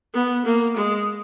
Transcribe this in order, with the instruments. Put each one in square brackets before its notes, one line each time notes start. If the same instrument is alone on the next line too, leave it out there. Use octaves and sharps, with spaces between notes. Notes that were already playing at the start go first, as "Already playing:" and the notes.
[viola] B3
A#3
G#3